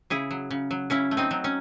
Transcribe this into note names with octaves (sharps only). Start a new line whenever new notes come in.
C#3 E4 G#4
F#3
C#3
F#3
C#3 C#4 E4
A3
C4 D#4
F#3
C#4